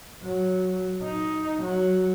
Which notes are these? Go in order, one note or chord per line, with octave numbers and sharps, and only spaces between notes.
F#3
D#4
F#3